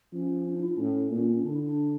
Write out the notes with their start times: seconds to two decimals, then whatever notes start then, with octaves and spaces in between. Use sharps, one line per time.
0.13 F3 C#4
0.45 C#4
0.53 D4
0.61 E4
0.69 D4
0.77 A2 C#4
1.10 A#2 A#3
1.17 C#4
1.24 A#3
1.33 C#4
1.43 D3 D4
1.53 E4
1.64 D4